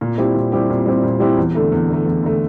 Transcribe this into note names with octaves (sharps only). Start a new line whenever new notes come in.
A#2
G3 C4 E4 G4
A#2
G3 C4 E4 G4
A#2
G3 C4 E4 G4
A#2
G3 C4 E4 G4
E2
D3 A3
E2
D3 A3
E2
D3 A3